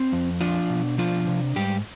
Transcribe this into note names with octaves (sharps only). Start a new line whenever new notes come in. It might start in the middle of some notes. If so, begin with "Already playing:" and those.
Already playing: C4
F2
F3 D4 F4
B2
F3 D4 F4
C3
G#2 G3 G4